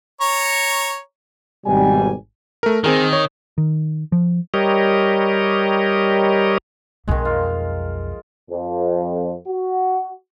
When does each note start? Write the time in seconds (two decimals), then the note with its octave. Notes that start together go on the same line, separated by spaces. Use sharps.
0.21 C#5 A#5 C#6
1.67 G#1 B2 G3 G#5
2.63 A3 A#4
2.84 D#3 C4 G#4 A#4
3.13 C#5
3.58 D#3
4.12 F3
4.54 G3 G4 A#4 C#5 D#5
7.08 B1 F2 D#3 G#3
7.25 F4
8.51 F2
9.47 F#4